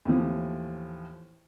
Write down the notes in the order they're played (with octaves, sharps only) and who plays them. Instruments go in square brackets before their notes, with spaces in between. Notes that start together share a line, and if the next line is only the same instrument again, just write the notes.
[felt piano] D#2 A2 E3 F3